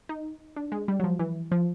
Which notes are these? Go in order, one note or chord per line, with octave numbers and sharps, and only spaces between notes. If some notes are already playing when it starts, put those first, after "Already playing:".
D#4
D4
G#3
G3
F#3
F3
E3
F3